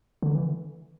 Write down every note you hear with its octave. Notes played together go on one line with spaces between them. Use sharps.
D3
E3